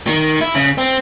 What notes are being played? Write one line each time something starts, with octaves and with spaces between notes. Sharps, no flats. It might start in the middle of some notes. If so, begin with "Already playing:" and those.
D#3
E4
C#3
C4